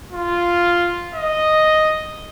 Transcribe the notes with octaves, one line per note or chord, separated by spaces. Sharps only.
F4
D#5